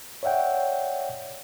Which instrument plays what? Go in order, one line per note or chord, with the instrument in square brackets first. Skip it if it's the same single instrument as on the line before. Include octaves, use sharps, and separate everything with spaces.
[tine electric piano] C#5 D5 E5 F#5 G5